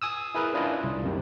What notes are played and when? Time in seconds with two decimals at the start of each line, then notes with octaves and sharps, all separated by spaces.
0.02 G#5 D#6 E6
0.35 E4 G#4 A#4 B4
0.54 C#4 D4 E4 F4 D5 D#5
0.84 C2
1.03 F#2 C3 D#3